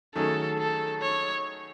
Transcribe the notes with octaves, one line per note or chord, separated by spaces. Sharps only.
D#3 F#3 A3 C#4 G#4 A4
A4
C#5